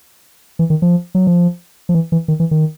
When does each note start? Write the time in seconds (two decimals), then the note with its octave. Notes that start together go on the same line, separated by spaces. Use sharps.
0.59 E3
0.70 D#3
0.82 F3
1.15 F#3
1.27 F3
1.89 F3
1.95 E3
2.12 E3
2.28 D#3
2.40 E3
2.51 D#3